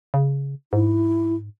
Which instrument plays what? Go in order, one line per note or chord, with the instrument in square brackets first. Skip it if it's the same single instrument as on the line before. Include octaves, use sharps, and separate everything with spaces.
[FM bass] C#3
[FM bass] G#2 [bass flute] E4